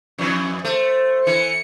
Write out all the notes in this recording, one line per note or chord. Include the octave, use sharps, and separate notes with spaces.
F2 E3
A3 C5
E3 C#7